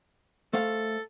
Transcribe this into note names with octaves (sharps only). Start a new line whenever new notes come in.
A3 A4 C5 F5